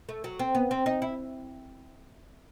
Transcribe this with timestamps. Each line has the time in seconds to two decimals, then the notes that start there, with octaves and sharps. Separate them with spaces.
0.09 A3
0.24 F#3
0.39 C4
0.55 B3
0.71 C4
0.86 D#4
1.02 E4